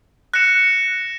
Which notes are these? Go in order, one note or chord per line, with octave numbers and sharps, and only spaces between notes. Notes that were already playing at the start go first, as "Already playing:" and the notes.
F#6 A#6 C#7 E7